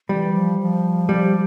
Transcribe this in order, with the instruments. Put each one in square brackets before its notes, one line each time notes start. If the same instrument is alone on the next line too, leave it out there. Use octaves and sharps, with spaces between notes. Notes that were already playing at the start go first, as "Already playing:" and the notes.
[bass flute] E3 [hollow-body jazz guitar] G3
[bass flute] F3
F3
[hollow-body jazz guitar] G3